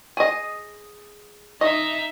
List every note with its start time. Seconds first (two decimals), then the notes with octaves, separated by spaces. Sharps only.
0.17 G#4 D#5
1.61 D#4 D#5 E5